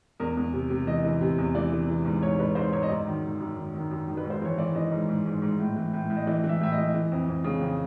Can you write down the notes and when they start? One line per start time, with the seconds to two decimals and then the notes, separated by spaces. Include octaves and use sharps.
0.20 E2 A#4
0.37 E2
0.53 C3
0.70 C3
0.87 E3 D#5
1.05 E3
1.21 C3
1.38 E2
1.55 E3 D5
1.72 E3
1.89 E3
2.05 G#2
2.23 G#2 C#5
2.39 G#2 B4
2.55 G#2 C5
2.73 G#2 C#5
2.83 D#5
2.89 F#2 D5
3.07 D#3
3.23 D#3
3.40 F#2
3.56 D#3
3.74 D#3
3.91 F#2
4.08 D#3
4.17 B4
4.24 G#2
4.30 C5
4.42 E3 C#5
4.58 E3 D5
4.75 E3 D#5
4.91 G#2
5.09 G#2
5.26 G#2
5.42 G#2
5.59 A2
5.76 E3
5.93 A2
6.10 A2
6.17 D#5
6.26 E3 D5
6.44 E3
6.49 E5
6.61 A2 E5
6.72 D#5
6.78 E3
6.94 E3
7.12 F2
7.28 F2
7.44 C#3
7.61 F2